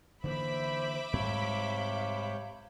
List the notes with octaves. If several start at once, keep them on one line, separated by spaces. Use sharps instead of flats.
D3 E3 A#3 C5 E5 B5 D6
G#2 C3 G3 C4 C#5 F5 G6